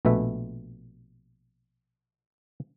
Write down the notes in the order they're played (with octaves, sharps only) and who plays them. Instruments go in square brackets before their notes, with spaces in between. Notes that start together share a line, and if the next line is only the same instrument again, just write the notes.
[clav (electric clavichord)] A#1 B2 A3 B4 E5